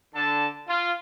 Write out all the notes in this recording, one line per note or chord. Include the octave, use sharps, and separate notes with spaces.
D3 A5
F4